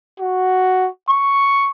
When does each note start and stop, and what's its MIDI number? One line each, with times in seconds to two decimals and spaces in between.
0.20 0.88 66
1.10 1.69 85